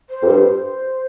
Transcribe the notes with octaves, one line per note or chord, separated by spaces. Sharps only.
C5
F2
G2 C5